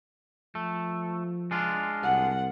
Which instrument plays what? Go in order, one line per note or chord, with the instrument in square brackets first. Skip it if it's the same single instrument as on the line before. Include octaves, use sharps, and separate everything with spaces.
[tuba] F3 [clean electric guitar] A3
[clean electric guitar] G#3 D4 F4
[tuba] C2 [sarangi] F#5